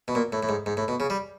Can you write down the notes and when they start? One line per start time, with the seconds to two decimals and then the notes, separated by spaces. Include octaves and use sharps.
0.08 B2
0.15 A#2
0.32 A2
0.43 A2
0.49 G#2
0.66 G#2
0.77 A2
0.88 B2
1.00 C#3
1.10 G3